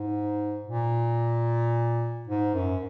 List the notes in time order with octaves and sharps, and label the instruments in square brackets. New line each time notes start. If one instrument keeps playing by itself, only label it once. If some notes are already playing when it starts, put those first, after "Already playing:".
Already playing: [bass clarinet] G#2
A#2
G#2
F#2